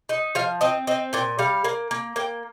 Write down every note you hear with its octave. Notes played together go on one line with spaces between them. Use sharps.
D#4
F3 F5
C4 D#5
C4 D#5
A#2 G5
G3 F5
A#3
A#3
A#3 G5